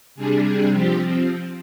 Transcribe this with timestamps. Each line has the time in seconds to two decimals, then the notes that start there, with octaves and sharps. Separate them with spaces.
0.15 C3 G3 D4 G#4
0.44 G#4
0.71 F3 C4 G4